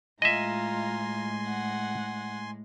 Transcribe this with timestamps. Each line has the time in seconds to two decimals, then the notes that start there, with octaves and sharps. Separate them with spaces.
0.22 A2 G#3 F4 D#5 E5 G#5 A#5 C6
1.47 F#5